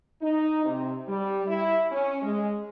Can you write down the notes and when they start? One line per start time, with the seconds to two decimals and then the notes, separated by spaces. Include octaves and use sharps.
0.22 D#4
0.65 C3
1.08 G3
1.47 E4
1.92 C#4
2.22 G#3